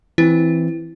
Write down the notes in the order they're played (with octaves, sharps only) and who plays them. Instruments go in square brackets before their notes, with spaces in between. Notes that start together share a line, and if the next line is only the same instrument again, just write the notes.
[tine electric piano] E3 C4 [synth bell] E4